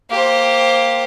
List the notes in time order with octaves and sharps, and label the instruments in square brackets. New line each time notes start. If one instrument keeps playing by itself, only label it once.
[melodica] A#3 [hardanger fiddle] G4 C5